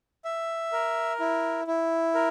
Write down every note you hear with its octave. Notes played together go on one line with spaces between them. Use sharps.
E5
A#4
E4
E4
A#4